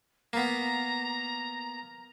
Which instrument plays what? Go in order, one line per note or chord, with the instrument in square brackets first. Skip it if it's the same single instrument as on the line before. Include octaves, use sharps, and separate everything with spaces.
[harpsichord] A#3 B3 [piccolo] A#5